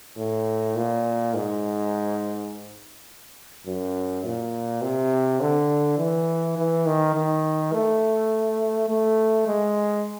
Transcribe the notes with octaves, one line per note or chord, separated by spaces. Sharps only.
A2
A#2
G#2
F#2
A#2
C3
D3
E3
E3
D#3
D#3
A3
A3
G#3